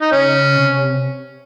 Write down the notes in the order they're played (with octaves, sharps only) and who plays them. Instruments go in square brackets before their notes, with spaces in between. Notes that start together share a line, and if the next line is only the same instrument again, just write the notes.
[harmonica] D#4
[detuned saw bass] C#3 [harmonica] C#4
[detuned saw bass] C3